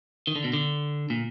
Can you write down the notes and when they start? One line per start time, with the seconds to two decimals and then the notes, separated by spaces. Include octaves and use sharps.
0.27 D#3
0.36 D3
0.44 B2
0.53 D3
1.10 A#2